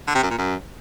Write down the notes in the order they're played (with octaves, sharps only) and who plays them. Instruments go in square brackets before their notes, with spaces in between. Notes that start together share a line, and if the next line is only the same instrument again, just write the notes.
[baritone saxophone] D3
C3
F#2
A#2
F#2